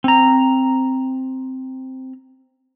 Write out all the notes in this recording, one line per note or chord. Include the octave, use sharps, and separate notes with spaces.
C4 A#5